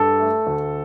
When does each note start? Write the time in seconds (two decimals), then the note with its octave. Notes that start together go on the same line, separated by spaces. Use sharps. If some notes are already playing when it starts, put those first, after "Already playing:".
Already playing: G2 A4
0.20 A3
0.47 D2